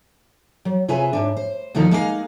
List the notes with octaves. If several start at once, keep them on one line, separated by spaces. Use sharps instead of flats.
F#3
C3 F4 G#4 B4 E5 G#5
G#2 C#3 D4
C5
D2 B2 D#3 F3 D#4 A4
G#3 A#3 D#4 G#4 B4 F5